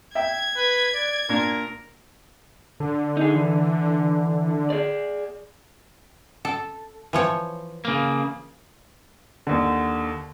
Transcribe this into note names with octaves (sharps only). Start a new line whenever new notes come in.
E5 G5 G#6
B4
D5
A#2 D4 A#4
D3
D#4 G#4
E3
G#4 D5
A4
E3 F3 C#5
C#3 A#3
D#2 D3